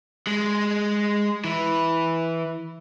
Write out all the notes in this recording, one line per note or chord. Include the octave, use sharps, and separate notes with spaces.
G#3
E3